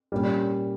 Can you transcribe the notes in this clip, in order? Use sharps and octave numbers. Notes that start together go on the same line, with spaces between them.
A#2 G3 C#4